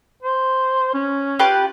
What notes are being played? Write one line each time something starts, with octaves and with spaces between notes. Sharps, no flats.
C5
C#4
F4 G4 B4